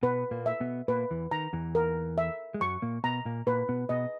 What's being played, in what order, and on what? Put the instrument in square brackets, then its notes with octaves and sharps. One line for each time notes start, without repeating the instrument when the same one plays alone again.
[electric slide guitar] B2 B3 [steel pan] B4
[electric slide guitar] A#2 A#3
[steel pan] E5
[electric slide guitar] B2 B3
[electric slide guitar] A#2 A#3 [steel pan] B4
[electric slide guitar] E2 E3
[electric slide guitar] D#3 [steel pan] A#5
[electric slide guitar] E2 E3
[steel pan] A#4
E5
[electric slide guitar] G#3
[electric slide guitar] F#2 F#3 [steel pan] C#6
[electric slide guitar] A#2 A#3
[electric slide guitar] B2 B3 [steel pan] A#5
[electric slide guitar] A#2 A#3
[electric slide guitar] A#2 A#3 [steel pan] B4
[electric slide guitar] B2 B3
[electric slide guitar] B2 B3 [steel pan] D#5